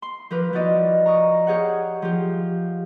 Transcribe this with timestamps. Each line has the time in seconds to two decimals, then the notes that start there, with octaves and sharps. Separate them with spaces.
0.02 C6
0.31 F3 A#4 B4 D6
0.53 F3 E4 F#4 D5 D#5
1.06 A#5 C#6 D#6
1.47 G4 G#4 C#5 F5 F#5
2.02 F3 G4